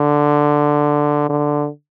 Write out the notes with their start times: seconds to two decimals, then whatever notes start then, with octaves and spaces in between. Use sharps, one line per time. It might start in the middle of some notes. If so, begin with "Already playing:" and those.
Already playing: D3
1.29 D3